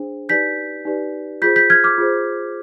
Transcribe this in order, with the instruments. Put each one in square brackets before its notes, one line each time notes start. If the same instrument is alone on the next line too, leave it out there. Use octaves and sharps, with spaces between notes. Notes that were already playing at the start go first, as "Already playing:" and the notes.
Already playing: [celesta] D4 G#4 C5
D#4 G4 B4 D5 G6 B6
D#4 G4 B4 D5
F4 G#4 C5 G6 B6
G6 B6
F6 G#6
D6 F6
F4 G#4 C5